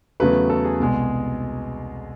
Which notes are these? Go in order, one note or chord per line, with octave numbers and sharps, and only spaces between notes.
E2 C#3 F#3 A3 B4
A4
G#4
C2 B2 G#3